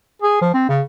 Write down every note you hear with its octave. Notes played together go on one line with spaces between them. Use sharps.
G#4
F3
C4
C#3